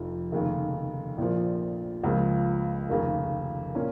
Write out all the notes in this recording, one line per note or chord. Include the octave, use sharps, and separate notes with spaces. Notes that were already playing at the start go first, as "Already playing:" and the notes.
Already playing: F1 F2 F3
F1 D#2 C#3
A#1 A#2 F3
C#2 C#3 F3 A#3
F1 D#2 C#3 A#3
A#2 A#3 C#4